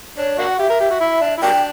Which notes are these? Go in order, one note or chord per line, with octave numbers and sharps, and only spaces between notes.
D4 C#5
A#3 D4 F#4 F#5
G4 E5
A#4
G4
F#4
E4
D4
E4
F#3 A#3 D4 G5